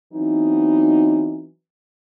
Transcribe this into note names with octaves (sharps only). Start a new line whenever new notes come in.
E3 F#3 B3 C4 D#4